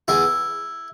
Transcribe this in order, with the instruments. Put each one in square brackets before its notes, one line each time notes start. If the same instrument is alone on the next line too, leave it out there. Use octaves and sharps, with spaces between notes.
[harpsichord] E2 E4